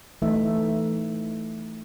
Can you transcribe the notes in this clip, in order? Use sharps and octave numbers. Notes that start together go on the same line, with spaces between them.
E3 A3 D#4 E5